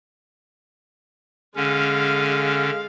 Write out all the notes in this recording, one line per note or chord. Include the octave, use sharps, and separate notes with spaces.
D3 G#3 C#4 F5